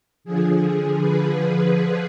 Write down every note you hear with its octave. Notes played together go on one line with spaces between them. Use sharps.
D3 F3 G#4
B4